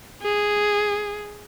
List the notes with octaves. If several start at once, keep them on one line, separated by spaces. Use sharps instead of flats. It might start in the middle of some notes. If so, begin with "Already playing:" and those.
G#4